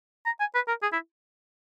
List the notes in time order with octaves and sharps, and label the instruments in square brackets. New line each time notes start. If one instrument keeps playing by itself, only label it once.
[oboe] A#5
G#5
B4
A#4
G#4
E4